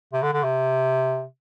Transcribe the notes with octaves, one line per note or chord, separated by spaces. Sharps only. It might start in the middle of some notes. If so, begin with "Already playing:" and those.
C3
D3
D3
C3